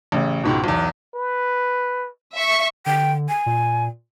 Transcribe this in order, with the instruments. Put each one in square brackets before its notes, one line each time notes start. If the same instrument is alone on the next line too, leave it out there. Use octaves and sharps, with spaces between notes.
[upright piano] A1 C#3
C#2 G#2 B2
B1 E2
[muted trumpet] B4
[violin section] E5 C#6
[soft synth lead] D3 [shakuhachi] G5
[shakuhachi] G#5
[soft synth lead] A#2